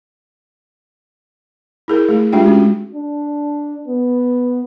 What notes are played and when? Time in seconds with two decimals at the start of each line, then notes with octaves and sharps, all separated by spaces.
1.88 E4 G#4 A#4
2.09 A3 G#4
2.33 G#3 D4 F4 G4 G5
2.46 C#4 F#4
2.95 D4
3.88 B3